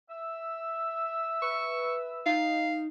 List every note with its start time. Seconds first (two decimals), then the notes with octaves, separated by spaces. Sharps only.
0.10 E5 E6
1.42 B4 C#6
2.26 D#4 F5